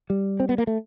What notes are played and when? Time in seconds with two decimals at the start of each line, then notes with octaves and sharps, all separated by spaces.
0.10 G3
0.40 C4
0.49 B3
0.58 A#3
0.67 A3